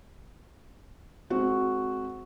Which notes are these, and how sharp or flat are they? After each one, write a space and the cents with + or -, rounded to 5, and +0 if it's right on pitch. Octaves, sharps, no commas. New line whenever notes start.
G#3 +35 C4 +5 F#4 +0